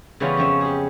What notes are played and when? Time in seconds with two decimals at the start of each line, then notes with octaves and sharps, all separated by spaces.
0.20 C#3 E3 G3 B3 C#4 F4
0.37 F2 F3 C#4 E5
0.61 G4 G#4